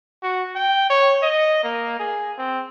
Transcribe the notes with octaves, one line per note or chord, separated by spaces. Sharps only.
F#4
G5
C#5
D#5
A#3
G#4
C4